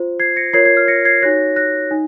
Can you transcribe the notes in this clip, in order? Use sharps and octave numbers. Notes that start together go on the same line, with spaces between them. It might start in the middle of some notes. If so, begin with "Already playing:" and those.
Already playing: F4 C5
G#6 C7
A#6 C#7
F4 A#4 C#5 G#6 C7
G#6 C7
F6 G#6
A#6 C#7
G#6 C7
D#4 F#4 C#5 F#6 A#6
F#6 A#6
D#4